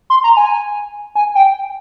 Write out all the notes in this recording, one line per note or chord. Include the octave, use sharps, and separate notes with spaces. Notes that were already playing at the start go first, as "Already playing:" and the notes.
C6
A#5
G#5
G#5
G5